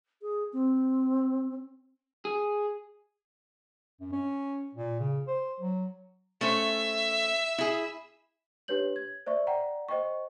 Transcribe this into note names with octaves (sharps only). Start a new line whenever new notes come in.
G#4
C4
G#4
F#2
C#4
A#2
C#3
C5
F#3
A3 C#4 C5 E5
E4 G#4
D4 G4 B4 C#5 G6 F#7
G#6
C5 D5 E5 C#6
D5 F#5 G5 A#5
C5 D#5 G5 C#6